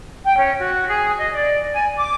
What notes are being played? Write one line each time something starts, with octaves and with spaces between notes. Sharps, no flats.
G5
C#4
F#4
G#4
D#5
D5
G#5
D6